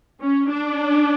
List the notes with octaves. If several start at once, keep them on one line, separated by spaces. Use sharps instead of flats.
C#4
D4